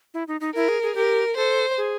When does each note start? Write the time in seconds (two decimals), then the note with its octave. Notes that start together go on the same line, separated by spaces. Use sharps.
0.14 E4
0.28 D#4
0.41 D#4
0.54 E4 A#4
0.69 G#4
0.83 G#4
0.95 G4 A#4
1.37 A4 C5
1.78 G#4